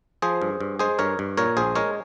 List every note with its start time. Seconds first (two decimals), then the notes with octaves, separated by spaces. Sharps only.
0.22 F3 G#4 C5
0.42 G2
0.60 G2
0.79 G#3 G#4 C5
0.99 G2 A#4 C#5
1.19 G2
1.37 A#2 A#4 C#5
1.57 A#1 G#4 C5
1.75 G#3 A#4 C#5